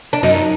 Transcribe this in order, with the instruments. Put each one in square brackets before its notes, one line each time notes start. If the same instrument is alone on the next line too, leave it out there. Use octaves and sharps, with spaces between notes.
[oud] D4
[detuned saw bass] F#2 [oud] D#4